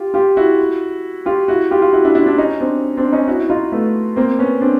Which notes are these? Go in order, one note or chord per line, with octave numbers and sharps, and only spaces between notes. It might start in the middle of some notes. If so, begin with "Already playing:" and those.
Already playing: F4 G4
F4 G4
E4 F#4
F4 G4
E4 F#4
F4 G4
F4
E4 F#4
D4 E4
D4 E4
D4 E4
C#4 D#4
C4 D4
C4 D4
C#4 D#4
E4 F#4
E4
D#4 F4
A3 B3
A#3 C4
B3 C#4
C4 D4